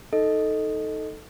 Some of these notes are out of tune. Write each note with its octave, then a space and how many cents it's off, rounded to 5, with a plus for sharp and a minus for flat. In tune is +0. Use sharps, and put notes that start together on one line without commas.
D#4 +5 A4 +0 D#5 +5